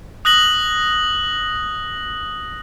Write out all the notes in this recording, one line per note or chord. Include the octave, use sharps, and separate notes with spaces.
D#6 F#6 A#6 F#7